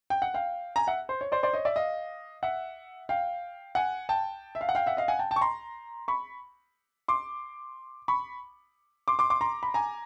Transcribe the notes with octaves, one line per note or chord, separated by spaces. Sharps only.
G5
F#5
F5 G5
G#5 A#5
E5 F#5
C5
C#5
C5 D5
C5 D5
C#5 D#5
D5 E5
D#5 F5
E5 F#5
F5 G5
F#5 G#5
G5 A5
E5
F5
F#5
F5 G5
E5 F#5
D#5 F5
F#5 G#5
G5 A5
G5 A5
C#6
A#5 C6
B5 C#6
C6 D6
B5 C#6
C6 D6
C6 D6
C6 D6
A#5 C6
B5
G#5 A#5